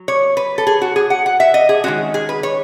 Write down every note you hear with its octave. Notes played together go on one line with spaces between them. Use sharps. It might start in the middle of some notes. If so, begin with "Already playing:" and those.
Already playing: F#3
C#5
B4
A4
G#4
F#4
G#4
F#5
F#5
E5
D#5
G#4
D#3 G#3 C#4 F#4
G#4
B4
C#5